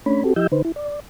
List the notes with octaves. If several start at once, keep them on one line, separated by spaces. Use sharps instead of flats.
A3 C#4 D4 C#5 B5
C4 F#4 G4 A4
F3 E4 G4 D#5 E6 G6
D3 D#4 B4 C5
E4
D5